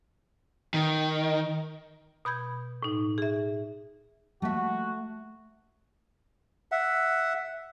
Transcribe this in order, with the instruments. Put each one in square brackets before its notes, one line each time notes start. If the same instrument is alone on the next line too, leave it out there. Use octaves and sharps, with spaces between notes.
[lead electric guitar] D#3
[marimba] B2 B5 G6 G#6
A2 D#4
G#4 E5
[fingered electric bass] F3 G3 A#3 [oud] A3 E5 [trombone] F#4
[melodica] E5 F#5